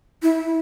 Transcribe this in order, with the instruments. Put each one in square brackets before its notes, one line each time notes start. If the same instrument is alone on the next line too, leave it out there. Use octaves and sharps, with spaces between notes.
[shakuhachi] E4